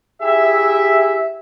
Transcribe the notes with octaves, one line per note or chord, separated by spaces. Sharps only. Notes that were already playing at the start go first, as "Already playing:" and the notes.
E4 G4 G#4 E5